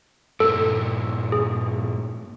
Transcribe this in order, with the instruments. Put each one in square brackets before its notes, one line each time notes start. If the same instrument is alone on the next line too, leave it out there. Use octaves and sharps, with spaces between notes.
[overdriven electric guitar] G2 A#2 [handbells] A4
[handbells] G#4